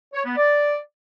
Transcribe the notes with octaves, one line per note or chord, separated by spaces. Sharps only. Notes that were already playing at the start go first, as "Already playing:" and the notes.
C#5
B3
D5